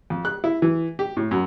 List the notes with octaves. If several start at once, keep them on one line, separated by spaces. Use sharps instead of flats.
F2
F#6
E4
E3
G4
A2
F#2